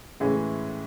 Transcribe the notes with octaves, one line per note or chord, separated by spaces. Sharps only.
A2 C#3 E3 G#3 C#4